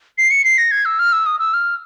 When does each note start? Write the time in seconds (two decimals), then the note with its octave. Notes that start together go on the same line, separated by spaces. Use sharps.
0.18 C7
0.31 C#7
0.44 C7
0.58 A#6
0.71 G#6
0.85 E6
0.99 F6
1.12 E6
1.26 D#6
1.39 E6
1.54 F6